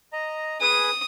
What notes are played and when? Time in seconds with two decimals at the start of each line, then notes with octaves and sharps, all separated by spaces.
0.13 D#5 A#5
0.61 G#4 B4 G#5 D#6